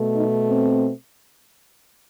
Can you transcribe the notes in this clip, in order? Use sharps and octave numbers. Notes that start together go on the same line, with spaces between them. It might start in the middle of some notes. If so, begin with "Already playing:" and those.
Already playing: B2 A3
D#4
C4